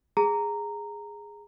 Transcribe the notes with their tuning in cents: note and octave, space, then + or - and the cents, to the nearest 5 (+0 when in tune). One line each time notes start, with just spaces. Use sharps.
G#4 -10 A#5 -10